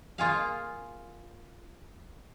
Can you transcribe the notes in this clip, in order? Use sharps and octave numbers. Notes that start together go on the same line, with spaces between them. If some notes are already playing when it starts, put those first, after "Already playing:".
A#3 F4 G#4 F5